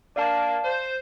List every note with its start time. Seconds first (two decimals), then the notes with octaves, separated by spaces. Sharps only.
0.16 A#3 D4 D5 F5 A5
0.63 C5